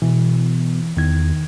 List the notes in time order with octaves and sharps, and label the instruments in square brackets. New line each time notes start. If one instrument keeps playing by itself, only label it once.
[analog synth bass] B2 [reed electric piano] E3
[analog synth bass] E2 [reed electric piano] D#3 G#6